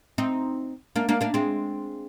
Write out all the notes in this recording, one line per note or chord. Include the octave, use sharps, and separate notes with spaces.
C4 D#4
A#3 D4
A#3 D4
A#3 D4
G#3 C4